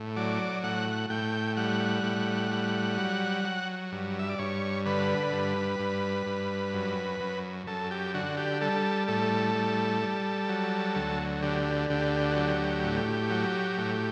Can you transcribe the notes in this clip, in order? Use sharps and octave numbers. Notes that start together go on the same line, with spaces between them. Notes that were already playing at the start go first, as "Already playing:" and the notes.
Already playing: A2
F#3 D5
A2 F#5
A2 G5
G3 F#5
A2
G3
F#3
F#3
G2
E5
D5
G2 C#5
D3 B4
G2
G2
G2
F#2
F#2
F#2 A4
G4
D3 F#4
G4
G3 A4
A2 A4
G3
G3
F#3
D2
D3 G4
D2 G4
F#4
F#3 G4
A2
F#3
A2